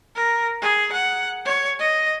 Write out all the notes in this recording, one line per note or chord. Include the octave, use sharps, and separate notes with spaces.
A#4
G#4
F#5
C#5
D#5